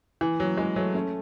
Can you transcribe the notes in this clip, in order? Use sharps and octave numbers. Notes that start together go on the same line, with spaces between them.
E3
F#3
E3 G#3
F#3 A3
A3 C#4